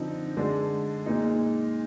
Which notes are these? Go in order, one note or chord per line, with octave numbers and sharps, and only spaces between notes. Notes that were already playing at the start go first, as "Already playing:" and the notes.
Already playing: D3 F3 C4 D#4
D3 G#3 D4
A#2 G#3 D#4